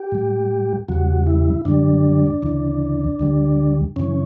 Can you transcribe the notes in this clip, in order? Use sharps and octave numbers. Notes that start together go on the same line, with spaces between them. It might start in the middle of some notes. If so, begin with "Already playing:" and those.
Already playing: G4
A2 G3
E2 C#3 G3 F#4
E4
F#2 D3 G3 D4
D2 C#3 E3
D2 D3 G3
F#2 C#3 E3 C#4